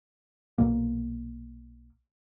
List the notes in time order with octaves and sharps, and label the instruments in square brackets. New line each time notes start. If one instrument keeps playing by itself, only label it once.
[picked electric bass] B1 A#2 A#3